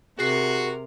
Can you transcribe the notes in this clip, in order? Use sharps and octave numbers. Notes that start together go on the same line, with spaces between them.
C3 F#4 G#4 A#4 C7